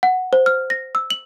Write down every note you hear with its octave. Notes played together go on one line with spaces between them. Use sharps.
F#5
C5
F6
A#6
E6
F#7